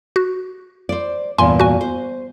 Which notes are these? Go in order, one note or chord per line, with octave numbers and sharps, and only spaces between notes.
F#4
C5 D5
E2 G2 A#2 G#5 C6
F#4 G#5
C5